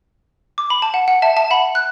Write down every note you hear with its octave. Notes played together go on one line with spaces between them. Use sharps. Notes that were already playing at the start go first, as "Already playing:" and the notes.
D6
B5
A5
F#5
F#5
E5 A5
E5 A5
F#5 B5
F#6